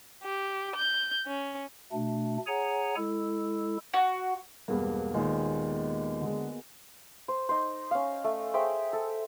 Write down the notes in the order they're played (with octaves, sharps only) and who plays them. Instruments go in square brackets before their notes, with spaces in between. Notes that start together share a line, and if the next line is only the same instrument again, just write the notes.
[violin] G4
G6
C#4
[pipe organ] B2 A3 D4
G#4 C#5 F#5 G#5 A#5
G#3 E4 A4
[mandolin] F#4
[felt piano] E1 G2 [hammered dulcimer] A#3 B3
[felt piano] D#2 A#2 D#3 [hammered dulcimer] G#3
[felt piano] D3 G#3 [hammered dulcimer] F#4
[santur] C5
D#4 C5
C#4 F5
A3
G#4 C5 E5 G5
A4